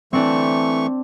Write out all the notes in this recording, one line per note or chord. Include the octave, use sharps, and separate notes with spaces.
E3 A3 C4 D4 C#6